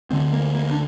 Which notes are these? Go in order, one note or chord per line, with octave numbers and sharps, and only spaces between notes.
D2 D3 C4
A#3
A#3
D4